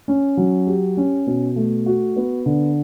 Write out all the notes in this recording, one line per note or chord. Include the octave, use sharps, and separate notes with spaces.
C#4
F#3
G4
C#4
B2
A3
F#4
B3
D3